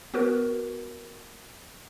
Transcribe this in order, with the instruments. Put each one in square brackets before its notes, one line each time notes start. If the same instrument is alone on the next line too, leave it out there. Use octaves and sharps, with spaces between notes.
[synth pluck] B3 F#4 A#4 B4